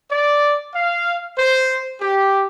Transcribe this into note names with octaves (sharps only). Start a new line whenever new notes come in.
D5
F5
C5
G4